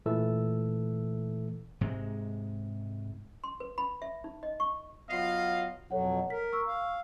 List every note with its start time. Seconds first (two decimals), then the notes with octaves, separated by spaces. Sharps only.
0.06 A#2 E3 A3 A4 E6
1.81 G#2 C3 G#3
3.44 C6
3.60 B4
3.78 B5
4.02 E5
4.24 D#4
4.43 D#5
4.60 C#6
5.10 F#3 B3 F4 D#5 F5
5.91 F2 B2 F#3 A4 C#5 F#5
6.30 A#4 B6
6.53 C#6 E6
6.67 F5